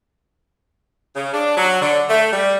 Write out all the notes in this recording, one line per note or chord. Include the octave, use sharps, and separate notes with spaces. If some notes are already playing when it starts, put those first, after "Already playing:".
C#3
D4
F#3
D3
A3
G3